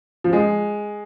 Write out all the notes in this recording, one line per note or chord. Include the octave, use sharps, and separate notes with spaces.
F3
G#3